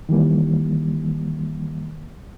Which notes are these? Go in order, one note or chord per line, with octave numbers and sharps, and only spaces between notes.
D#3 E3 G3 A#3